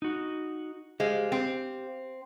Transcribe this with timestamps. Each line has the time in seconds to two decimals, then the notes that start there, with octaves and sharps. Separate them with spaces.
0.02 D#4 F#4
1.00 G#3 G4 C5 F5
1.32 C4